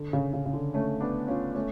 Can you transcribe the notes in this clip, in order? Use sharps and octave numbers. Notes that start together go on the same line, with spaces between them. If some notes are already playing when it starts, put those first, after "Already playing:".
Already playing: D3
C#3
C#3
C#3
D3
A3 C#4
B3 D4
C#4 F4
A3 C#4